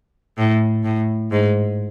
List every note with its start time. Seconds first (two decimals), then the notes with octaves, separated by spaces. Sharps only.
0.38 A2
0.84 A2
1.32 G#2